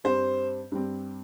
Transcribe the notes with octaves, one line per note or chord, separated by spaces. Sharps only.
G2 G3 C4 C5
G2 G3 C4